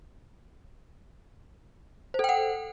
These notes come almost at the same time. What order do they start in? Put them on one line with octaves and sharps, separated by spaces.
C5 A4 G5 F#5